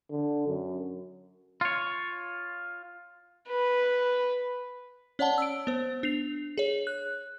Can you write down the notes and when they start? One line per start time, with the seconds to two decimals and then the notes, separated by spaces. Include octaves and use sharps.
0.10 D3
0.48 F#2
1.61 F4 C#5
3.48 B4
5.19 C#4 C#5 D5 F#5 A5 G7
5.38 E6 D7
5.67 B3 C5
6.03 D4 C7 F7
6.58 G#4 C#5
6.87 F#6